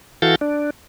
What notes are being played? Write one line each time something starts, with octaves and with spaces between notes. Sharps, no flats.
E3 F#4 A4 F5 G6 A6
D4